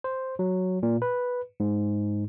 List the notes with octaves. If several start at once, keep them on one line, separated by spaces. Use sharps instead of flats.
C5
F#3
A#2
B4
G#2